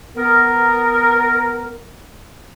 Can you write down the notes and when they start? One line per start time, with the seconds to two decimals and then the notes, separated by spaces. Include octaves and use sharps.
0.17 B3 A#4